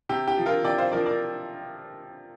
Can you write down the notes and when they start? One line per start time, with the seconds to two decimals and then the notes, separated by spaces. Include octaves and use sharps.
0.09 C3 G4
0.28 G4
0.37 F3
0.46 F4 A#4
0.64 C3 D5 G5
0.78 C5 F5
0.92 F3 A#4 D5
1.06 A#4 D5